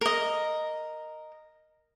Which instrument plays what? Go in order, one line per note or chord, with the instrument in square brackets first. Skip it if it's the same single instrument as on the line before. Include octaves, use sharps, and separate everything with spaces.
[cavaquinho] A#4 D#5